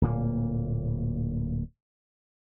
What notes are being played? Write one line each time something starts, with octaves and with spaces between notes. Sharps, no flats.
D1 A#2 A#3